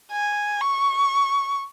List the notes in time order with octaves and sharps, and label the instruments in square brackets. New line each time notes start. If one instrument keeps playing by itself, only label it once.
[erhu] G#5
C#6